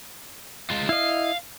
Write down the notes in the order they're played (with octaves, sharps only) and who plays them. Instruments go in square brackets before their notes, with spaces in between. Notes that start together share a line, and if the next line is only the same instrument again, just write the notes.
[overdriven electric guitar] G#3 F4
[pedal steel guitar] E4 D#5 [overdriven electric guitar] F5